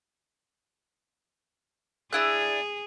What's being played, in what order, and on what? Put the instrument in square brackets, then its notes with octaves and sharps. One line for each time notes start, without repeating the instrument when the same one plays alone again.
[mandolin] D4 E4 F#6 [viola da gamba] G#4